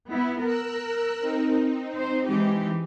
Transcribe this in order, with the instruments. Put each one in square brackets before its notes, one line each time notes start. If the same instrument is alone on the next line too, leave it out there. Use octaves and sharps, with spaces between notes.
[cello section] B3 E4
[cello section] A#4 [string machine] E6 F#6
[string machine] C4 D#4
[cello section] C5
E3 G#3 G4